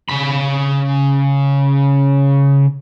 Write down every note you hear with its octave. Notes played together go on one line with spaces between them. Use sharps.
C#3 B5